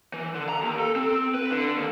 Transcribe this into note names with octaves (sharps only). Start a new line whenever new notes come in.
E3
D3
A#5
D#2
A4
C4
B4
D3
D#2